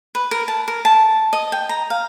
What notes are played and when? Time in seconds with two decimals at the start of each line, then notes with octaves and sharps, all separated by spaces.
0.15 B4
0.31 A#4
0.48 A5
0.68 A#4
0.85 A5
1.33 D#5
1.52 G5
1.69 A#5
1.90 F5